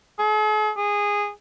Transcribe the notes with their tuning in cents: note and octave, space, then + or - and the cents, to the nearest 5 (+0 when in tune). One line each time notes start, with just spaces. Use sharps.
G#4 +45
G#4 -15